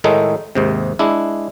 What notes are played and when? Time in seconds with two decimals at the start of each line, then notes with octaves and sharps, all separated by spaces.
0.04 A2 D#3 G#3 A3 D#4
0.55 D#2 G#2 C3
0.99 G#3 D4 E4